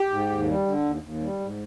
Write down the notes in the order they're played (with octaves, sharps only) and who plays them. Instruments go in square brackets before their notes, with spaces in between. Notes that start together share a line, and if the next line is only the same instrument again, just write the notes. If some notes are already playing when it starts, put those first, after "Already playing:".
Already playing: [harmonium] G4
G#2
D#2
G3
D3
D#2
D#2
G3
G#2